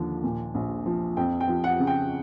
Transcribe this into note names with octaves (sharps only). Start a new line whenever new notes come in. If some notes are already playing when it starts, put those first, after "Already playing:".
Already playing: D#2 D3 F3
A#2
A#1
F3
F2 G5
G5
F3
F#5
C#3
G5